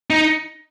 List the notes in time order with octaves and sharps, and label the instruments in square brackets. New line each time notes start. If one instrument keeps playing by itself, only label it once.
[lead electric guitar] D#4